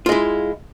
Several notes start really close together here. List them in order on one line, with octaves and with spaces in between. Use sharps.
F4 G#3 E4